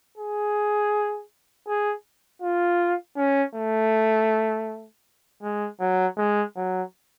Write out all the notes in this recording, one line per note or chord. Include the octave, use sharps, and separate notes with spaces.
G#4
G#4
F4
C#4
A3
G#3
F#3
G#3
F#3